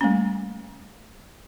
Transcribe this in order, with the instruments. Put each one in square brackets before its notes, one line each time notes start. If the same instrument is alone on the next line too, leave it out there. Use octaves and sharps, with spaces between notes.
[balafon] G3 A3 A#3 C#4